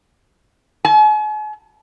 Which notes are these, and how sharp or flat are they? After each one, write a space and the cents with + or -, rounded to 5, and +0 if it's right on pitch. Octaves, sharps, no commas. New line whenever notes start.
G#5 +45